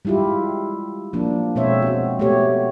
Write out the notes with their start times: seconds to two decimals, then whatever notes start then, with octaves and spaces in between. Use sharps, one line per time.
0.05 G3 G#3 E4 F4 G4
1.13 F3 A#3 D4
1.55 B2 G#3 C4 C5 C#5 E5
1.82 C4 F#4
2.19 A3 B3 G4 C#5